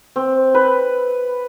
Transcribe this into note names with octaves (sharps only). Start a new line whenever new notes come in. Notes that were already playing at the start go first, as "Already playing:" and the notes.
C4
B4